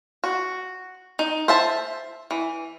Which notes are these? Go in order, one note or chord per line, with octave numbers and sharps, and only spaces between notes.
F#4
D#4
C5 E5 A5
E3